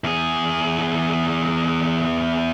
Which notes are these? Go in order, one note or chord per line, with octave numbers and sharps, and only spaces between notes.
E2 G#4